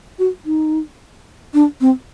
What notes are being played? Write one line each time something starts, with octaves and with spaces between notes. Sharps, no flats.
F#4
D#4
D4
C4